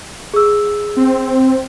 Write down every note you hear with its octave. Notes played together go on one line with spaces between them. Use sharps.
G#4 E6
C4